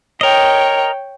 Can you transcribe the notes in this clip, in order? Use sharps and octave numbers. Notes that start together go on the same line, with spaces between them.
A#4 C#5 D#5 G5